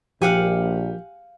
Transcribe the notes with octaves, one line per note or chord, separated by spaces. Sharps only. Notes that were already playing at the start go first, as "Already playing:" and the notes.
A#1 F3 G4 F5 F#5 G#5